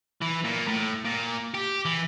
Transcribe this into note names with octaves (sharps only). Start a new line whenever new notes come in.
E3
A#2
A2
A#2
G4
E3